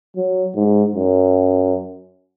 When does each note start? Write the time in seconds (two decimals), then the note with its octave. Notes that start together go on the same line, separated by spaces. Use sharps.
0.17 F#3
0.56 G#2
0.95 F#2